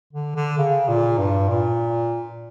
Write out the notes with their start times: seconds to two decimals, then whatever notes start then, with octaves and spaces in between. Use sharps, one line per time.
0.13 D3
0.36 D3
0.58 C#3
0.88 A#2
1.18 G2
1.49 A#2